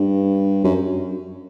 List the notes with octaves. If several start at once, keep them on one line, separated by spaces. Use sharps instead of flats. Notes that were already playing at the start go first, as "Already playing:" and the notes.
Already playing: G2
F#2